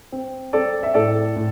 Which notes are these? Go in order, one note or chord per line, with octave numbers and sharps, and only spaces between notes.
C4
C4 A4 D5
E5
A2 A4 D5
A2